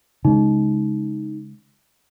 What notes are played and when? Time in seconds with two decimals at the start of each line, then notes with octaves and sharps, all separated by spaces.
0.25 C#3 G#3 D#4